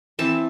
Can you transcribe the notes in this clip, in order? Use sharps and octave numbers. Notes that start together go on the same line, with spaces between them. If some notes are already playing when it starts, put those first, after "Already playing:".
E3 C4 A5